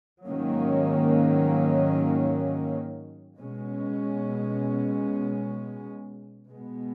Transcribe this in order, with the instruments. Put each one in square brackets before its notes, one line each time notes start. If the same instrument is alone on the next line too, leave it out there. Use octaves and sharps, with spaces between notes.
[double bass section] G#2 D#3 F#3 A#3 C#4
B2 G#3 C#4
B2 G#3 B3